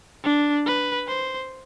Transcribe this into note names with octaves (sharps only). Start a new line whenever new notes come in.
D4
B4
C5